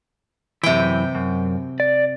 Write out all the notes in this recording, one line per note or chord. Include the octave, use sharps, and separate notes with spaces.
F#2 C3 E3 G5
F#2
D5